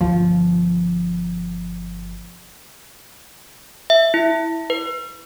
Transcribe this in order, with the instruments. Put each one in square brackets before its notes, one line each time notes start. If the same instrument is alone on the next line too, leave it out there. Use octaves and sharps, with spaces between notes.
[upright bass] G1 F3
[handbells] E5
E4
B4